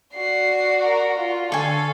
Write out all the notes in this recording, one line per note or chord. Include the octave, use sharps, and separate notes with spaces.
F#4 D5 C7
A#4
F4
D3 A4 F5 G#5 C#6